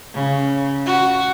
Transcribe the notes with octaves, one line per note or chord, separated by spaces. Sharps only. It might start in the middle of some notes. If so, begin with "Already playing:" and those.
C#3
F#4